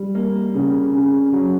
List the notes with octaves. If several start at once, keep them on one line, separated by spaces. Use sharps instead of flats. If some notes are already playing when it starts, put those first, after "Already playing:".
Already playing: G3
A#3
C#3
C#3
F#3